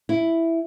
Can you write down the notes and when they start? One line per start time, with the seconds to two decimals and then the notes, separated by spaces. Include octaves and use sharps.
0.09 E4